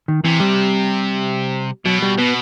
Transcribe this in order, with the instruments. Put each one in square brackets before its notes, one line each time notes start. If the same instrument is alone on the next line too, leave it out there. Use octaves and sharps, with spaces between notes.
[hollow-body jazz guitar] D#3
[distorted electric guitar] C3 [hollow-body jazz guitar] E3
[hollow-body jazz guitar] G3
[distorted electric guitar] B2 [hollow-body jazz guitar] F#3
[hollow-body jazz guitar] G3
[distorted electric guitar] B2 [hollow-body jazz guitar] B3